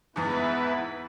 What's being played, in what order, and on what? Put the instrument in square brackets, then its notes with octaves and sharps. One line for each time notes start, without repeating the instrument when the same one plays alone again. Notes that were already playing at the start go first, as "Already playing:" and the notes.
[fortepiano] E2 G#2 [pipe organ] B3 E4 B4